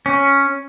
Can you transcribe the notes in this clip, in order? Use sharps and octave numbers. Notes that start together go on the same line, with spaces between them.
C#4